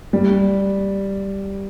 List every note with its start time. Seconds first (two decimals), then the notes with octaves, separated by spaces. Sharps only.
0.13 G3